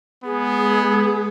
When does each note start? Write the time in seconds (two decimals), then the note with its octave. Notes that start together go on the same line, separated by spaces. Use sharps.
0.24 G#3 B3 G#4